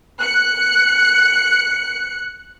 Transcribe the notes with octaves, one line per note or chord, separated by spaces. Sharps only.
F#6 C#7